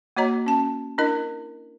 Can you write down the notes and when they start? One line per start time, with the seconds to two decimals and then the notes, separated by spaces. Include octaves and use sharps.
0.17 A#3 F#4 C#5 D#5 A#5
0.46 C#4 A5
0.98 D4 E4 A#4 D#5